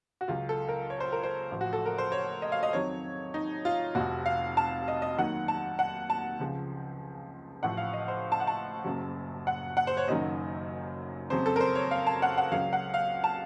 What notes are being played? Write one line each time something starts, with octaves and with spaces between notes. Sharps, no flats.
F#4
C#2 C#3 F#3 F4
A4
A#4
C#5
C5
A#4
C5
A1 A2 F3
F#4
A4
A#4
C5
C#5
D#5
F5
D#5
F2 D#3 F#3 C#5
D#4
F4
F1 F2 C3 F#4
F5
A5
D#5
D#5
D#2 D#3 F#3 F#5
A5
F#5
A5
C#2 C#3 F3
A1 A2 F3 F#5
F5
D#5
C5
A5
F#5
A5
F#1 F#2 C#3 F#3
F#5
F#5
C5
C#5
F#1 F#2 D#3 F#3 D#5
F2 C#3 F#3 C5
A4
A#4
C5
C#5
F5
A5
F#5
F#5
C#2 C#3 F#3 F5
F#5
F5
A5